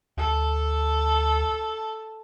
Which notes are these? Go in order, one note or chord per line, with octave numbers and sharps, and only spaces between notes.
D2 A4